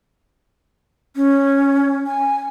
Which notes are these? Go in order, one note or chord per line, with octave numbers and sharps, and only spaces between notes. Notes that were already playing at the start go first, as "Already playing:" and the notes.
C#4
G#5